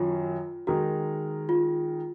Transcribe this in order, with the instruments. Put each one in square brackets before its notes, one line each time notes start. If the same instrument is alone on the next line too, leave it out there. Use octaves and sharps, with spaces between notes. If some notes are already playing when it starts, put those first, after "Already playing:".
Already playing: [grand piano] F#2 D#3 F#3 [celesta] F4
[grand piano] D#3 G#3 D#4 A#4 [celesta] F#4
[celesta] F4